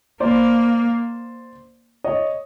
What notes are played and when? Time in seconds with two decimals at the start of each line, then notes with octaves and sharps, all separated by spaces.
0.20 A#3 C5 D5
2.04 C#5 D#5